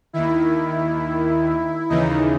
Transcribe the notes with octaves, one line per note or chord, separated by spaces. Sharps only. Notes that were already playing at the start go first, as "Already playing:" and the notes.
D#2 D#3 E4
D#2 C#3 E3 D#4